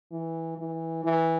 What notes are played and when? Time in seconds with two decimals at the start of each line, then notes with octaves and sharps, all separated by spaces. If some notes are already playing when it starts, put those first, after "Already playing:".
0.12 E3
0.58 E3
1.04 E3